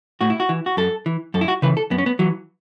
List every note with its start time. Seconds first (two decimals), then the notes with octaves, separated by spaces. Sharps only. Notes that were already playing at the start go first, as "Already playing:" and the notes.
0.21 A2 F#4
0.30 E4
0.40 F#4
0.49 E3
0.66 F#4
0.77 F#2 A4
1.06 E3
1.34 F#2 A4
1.41 E4
1.48 F#4
1.62 C#3 E3 B4
1.77 A4
1.91 F#2 B3
1.98 C#4
2.06 B3
2.19 E3 F#3